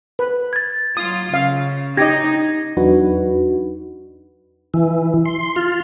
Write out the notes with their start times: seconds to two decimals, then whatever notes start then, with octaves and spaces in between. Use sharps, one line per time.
0.19 B4
0.53 G#6 A6
0.97 F#3 F4 D#6
1.34 C#3 F5
1.97 D#4 G4 D#5 G#6 A#6
2.77 E2 F#3 D4 D#4 F#4 B4
4.74 E3
5.25 C6
5.56 F4